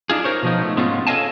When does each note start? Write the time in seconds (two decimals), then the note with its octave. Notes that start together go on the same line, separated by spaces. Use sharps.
0.10 D4 D#4 F4 G#4
0.24 A#4 C5 C#5
0.43 B2 F3 D#4
0.62 A3
0.76 G#2 G#3 B3 C#4 F4
1.07 A4 C#5 D#5 F5 G#5 A5